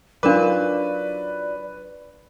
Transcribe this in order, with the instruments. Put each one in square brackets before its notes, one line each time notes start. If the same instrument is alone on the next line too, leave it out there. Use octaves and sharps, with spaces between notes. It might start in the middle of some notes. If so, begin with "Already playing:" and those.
[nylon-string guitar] F#3 D#4 F4 [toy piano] D4 A#4 D6 [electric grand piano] B4 [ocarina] D5